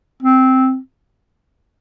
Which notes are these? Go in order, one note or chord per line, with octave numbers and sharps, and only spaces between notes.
C4